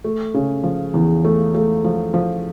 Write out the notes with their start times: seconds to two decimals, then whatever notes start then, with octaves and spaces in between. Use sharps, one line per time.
0.04 A3
0.34 C#3
0.63 F3
0.94 E2
1.24 A3
1.54 A3
1.84 F3
2.14 F3